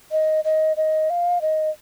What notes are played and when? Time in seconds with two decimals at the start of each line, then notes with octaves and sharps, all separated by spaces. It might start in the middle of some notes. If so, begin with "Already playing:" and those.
0.12 D#5
0.44 D#5
0.77 D#5
1.10 F5
1.41 D#5